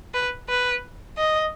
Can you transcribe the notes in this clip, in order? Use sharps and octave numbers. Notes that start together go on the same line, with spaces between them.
B4
B4
D#5